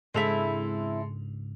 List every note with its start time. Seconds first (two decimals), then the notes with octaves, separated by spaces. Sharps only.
0.14 G#2 C#3 G#3 C4 D4 E4 A4 F7